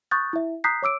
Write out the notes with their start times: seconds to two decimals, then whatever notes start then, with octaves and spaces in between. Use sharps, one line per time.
0.11 C#6 D#6 F#6 G6 A6
0.33 E4 E5
0.64 A#5 D#6 F#6 G6 B6 C7
0.82 C#5 D6 E6 D7